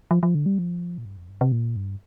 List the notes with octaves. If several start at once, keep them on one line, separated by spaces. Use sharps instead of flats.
F3
F3
D3
G3
F3
A#2
G2
F2
G2
C3
A#2
G2